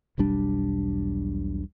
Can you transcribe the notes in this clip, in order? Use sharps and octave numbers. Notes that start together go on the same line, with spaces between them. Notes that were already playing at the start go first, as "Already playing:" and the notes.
E1 B1 G3 D4